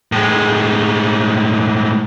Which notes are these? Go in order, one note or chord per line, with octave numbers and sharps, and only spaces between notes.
A2 G#3